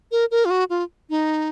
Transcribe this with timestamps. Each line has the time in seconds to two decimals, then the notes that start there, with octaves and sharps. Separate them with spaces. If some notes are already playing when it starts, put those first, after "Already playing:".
0.11 A#4
0.31 A#4
0.45 F4
0.50 F#4
0.70 F4
1.10 D#4